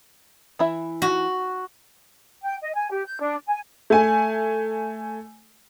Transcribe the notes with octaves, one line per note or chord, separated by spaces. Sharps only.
E3 E4 E5
F#4
G5
D#5
G#5
G4
G6
D4
G#5
A3 G#5